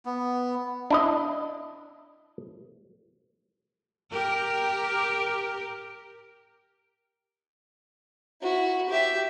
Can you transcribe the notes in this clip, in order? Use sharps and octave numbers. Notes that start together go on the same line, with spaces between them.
B3
D4 E4 D#5
G4 A#4
E4 F#4
G4 E5